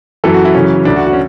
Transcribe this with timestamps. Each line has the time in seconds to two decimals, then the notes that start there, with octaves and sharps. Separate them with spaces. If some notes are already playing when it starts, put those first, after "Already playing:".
0.24 F#2 E3 A4
0.34 F#4
0.45 E4
0.54 F#2 C#3 E3 C#4
0.85 D2 D3 D4
0.96 F#4
1.07 F#4
1.13 C#4